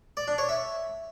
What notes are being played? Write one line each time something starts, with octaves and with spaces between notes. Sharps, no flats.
D5
D4
C#5
E5